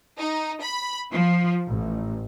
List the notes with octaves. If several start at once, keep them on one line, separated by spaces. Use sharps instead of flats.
D#4
B5
F3
A1